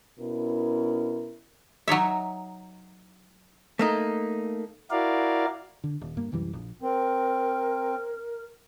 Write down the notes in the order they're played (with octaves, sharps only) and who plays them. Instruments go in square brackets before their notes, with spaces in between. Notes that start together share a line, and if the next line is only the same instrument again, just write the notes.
[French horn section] B2 C#4 E4 A#4
[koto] F#3 D#4 C#5 E5
[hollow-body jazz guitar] A3 A#3 D#4
[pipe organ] E4 F#4 A#4 D5 F5
[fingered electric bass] D3
D#1
G2 A#3
C2 F#2 E3 G3
A#1
[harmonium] C4 [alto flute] A#4